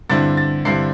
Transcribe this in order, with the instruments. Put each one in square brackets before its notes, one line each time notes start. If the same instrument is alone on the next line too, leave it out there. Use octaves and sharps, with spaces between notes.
[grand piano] G2 D3 C4 E4 A6
A6
G2 D3 C4 E4 C7